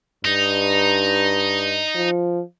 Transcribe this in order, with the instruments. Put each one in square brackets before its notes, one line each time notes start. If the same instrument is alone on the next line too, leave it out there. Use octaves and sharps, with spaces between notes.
[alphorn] G2 [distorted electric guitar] D#4
[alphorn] F3